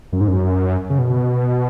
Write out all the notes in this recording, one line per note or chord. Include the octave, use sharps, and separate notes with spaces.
F#2
G#2
F#2
C#3
B2